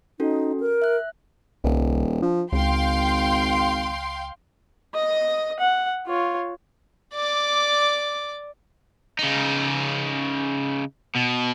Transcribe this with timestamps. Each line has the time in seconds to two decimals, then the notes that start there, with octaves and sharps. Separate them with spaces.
0.20 C#4 D#4 F#4 A4
0.60 A#4
0.82 E5 F#6
1.64 D#1 C2
2.22 F3 D4
2.52 G#1 C#2 F5 G5 C6
4.94 D#5 D#6
5.59 F#5
6.07 F4 C#5
7.14 D5 D6
9.19 C#3 D#4
11.15 B2